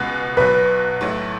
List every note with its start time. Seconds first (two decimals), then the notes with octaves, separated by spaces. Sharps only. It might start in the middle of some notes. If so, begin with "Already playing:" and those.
Already playing: C#2 B2 G#3 B3
0.37 B1 B2 F#3 B4
1.01 B1 A2 F#3 A3